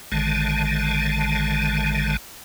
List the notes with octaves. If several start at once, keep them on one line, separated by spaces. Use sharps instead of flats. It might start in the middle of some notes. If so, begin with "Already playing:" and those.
A1 D3 D#3 G#3 A5